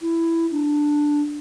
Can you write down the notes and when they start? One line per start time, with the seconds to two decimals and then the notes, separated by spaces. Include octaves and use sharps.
0.01 E4
0.51 D4